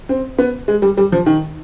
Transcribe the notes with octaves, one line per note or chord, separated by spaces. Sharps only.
C4
B3
G#3
G3
G3
F3
D#3